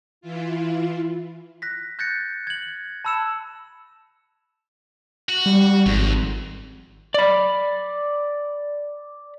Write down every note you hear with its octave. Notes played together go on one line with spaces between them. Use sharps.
E3 E4 F4
F#6 A#6 B6
F#6 G6 A6 A#6 C#7
G#6 F#7
A5 B5 E6 C#7 E7
F#4
G3
G#1 F2
D5 B5